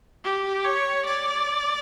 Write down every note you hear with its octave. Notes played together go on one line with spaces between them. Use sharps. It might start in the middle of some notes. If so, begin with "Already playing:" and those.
G4
C#5
D5